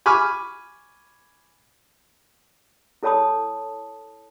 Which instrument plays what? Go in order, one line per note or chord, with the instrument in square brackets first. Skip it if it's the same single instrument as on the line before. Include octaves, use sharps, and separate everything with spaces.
[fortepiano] G#5 B5 C#6 D6 F6
[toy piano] E4 A4 C#5 A5 B5 D#6